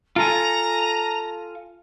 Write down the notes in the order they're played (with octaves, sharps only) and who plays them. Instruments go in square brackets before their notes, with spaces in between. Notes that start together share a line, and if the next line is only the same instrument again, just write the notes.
[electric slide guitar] F4 A4 G#5 [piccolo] A#5